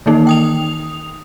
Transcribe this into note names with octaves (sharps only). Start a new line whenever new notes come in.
D#3 E3 A#3 D#4
G5 D#6 F7